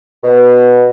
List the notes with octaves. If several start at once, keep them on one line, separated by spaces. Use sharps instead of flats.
B2